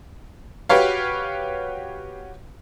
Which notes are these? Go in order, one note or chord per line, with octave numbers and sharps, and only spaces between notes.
F#4 G4 B4 C#5 F5